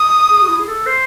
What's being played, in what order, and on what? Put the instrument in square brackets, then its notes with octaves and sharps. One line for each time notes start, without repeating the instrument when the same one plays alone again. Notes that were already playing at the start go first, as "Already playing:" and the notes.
Already playing: [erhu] D#6
[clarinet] G#4
F#4
E4
G#4
A4
C5